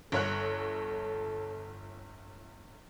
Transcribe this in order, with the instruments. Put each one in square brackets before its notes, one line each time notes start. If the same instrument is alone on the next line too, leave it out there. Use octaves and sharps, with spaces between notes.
[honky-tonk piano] G1 C#5 F#6 [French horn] A4